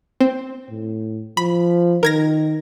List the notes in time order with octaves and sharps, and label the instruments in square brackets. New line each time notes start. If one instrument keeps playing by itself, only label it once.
[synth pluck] C4
[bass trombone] A2
[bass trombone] F3 [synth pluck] B5
[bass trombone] D#3 [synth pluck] A#4 G#6 A#6